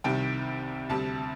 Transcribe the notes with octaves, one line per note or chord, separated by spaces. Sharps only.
C2 C3 D#3 G3 G5
D2 C3 G3 A5